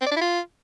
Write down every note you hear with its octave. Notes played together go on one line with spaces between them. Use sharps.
C4
D5
D4
E4
F4